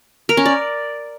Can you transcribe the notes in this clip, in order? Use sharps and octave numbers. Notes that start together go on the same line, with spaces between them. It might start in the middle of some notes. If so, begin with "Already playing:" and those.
A#4
C#4
D5